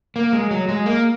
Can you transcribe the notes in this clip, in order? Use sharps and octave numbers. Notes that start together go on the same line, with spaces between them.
A#3
G#3
F#3
G#3
A#3